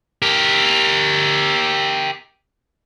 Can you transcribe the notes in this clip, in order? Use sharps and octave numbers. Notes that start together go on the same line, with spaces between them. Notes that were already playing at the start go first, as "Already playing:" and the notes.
G4 A#4